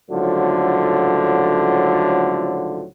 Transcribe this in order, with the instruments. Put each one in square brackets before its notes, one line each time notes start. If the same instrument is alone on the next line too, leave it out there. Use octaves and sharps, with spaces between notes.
[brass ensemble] C#2 A2 D3 F3 F#3